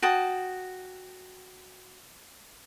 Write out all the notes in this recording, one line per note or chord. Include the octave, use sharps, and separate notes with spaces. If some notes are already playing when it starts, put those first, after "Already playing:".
F#4 G5 A5 D#6